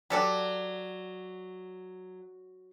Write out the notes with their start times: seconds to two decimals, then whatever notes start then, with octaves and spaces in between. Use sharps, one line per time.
0.10 F#3 G4 A4 D5